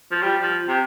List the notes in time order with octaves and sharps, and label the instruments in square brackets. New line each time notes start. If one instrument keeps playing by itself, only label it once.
[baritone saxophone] F3
G3
F3
C3